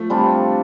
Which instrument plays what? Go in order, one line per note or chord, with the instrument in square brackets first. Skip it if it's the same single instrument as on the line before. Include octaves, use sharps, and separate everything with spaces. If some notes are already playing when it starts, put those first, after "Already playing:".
Already playing: [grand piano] F3 A3
[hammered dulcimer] C3 G3 D4 F4